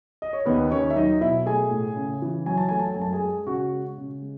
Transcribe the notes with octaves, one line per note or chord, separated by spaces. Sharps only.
D#5
C#5
D#2 B3 B4
D#2 C#4 C#5
E5
F#3 D#4 D#5
B2 E4 E5
A3 G#4 G#5
A2
C#3
E3
F#3 G#5
A5
A3 G#5
A5
G#5
F#2
A5
G#4 G#5
G#3
C#3 F#4 F#5
G#3
C#3
G#3